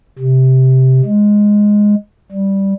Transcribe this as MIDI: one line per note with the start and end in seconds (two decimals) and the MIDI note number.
0.19 1.01 48
1.05 1.95 56
2.32 2.74 55